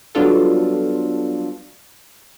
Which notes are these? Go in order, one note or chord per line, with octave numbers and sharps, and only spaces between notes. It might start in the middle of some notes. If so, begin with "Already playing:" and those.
F#3 G3 B3 D4 F4 A4